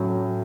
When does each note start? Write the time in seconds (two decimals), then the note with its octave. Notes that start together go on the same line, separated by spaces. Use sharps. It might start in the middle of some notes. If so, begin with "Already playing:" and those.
Already playing: A2 F#3 C#4